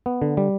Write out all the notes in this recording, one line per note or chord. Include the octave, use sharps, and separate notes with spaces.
B3
D3
G3